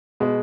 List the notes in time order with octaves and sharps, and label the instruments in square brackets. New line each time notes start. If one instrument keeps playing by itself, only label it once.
[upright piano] B2 G#3